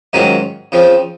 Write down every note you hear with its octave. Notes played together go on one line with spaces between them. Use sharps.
G#2 D#3 F#3 C#4 F4
C#3 F3 C4